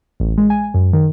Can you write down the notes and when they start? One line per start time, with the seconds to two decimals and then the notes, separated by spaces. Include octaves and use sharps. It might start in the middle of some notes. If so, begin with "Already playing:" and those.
0.20 A1
0.38 G#3
0.50 G#5
0.74 F#2
0.93 D#3